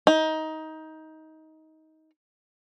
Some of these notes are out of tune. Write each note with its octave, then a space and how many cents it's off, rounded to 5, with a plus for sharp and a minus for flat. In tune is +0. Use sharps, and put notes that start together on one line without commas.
D#4 +20